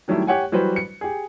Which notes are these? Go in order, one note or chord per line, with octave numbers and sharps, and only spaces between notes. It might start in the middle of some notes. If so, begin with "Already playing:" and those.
D#3 F#3 G3 A3 E4
G4 C#5 F#5 G#5
E3 F#3 G3 F#4 B4 C5
C#7
G4 G#4